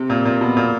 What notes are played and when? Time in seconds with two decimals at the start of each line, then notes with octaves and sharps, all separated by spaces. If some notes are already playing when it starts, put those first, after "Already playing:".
Already playing: C3
0.10 A#2
0.25 A#2
0.41 B2
0.57 A#2